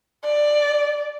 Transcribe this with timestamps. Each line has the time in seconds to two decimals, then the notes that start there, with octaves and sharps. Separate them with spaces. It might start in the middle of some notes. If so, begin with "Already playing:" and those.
0.25 D5